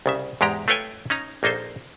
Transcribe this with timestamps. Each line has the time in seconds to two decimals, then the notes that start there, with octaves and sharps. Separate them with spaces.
0.06 C2 C#3 E5
0.41 E2 G#2 G#3 G4 A#5
0.68 A3 F4 B4 C#5 G5 G#5
1.10 C#4 D#4 A#5
1.43 A#1 A#3 D#4 A4 C5